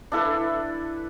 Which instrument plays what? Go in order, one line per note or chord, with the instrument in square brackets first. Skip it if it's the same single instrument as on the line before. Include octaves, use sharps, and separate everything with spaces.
[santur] D4 E4 A4 B4